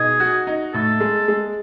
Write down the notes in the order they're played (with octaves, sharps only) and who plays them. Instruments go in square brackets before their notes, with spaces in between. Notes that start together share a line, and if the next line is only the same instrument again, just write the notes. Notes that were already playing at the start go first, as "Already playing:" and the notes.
Already playing: [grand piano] B2 D#4 [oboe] G#4
[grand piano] F#4
D#4
[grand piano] A2 [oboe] A4
[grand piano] G#3
G#3